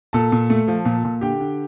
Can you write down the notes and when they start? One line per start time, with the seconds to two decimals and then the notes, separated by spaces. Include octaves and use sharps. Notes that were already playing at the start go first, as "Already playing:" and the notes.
0.13 A#2 A4 A5
0.32 A#2
0.50 A3
0.68 F3
0.85 A#2
1.05 A#2
1.21 D3 G4 G5
1.40 D3